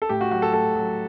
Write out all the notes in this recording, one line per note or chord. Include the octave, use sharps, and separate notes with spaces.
A4
A2 G4
F#4
F#3 F#4
A4
A2 A4
F#3